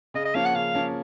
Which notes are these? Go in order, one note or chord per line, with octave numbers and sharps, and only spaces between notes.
C#3 D#5
D#5
F3 A#3 C#4 F5
F#5
C#3 F5
F3 A#3 C#4